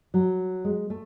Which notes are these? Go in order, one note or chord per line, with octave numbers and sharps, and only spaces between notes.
F#3
G#3
A3